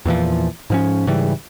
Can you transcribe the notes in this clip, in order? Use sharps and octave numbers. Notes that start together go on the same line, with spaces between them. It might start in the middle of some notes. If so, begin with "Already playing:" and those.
E2 A#2 E3 F3
G#2 F3 C#4
G#2 C#3 E3 G3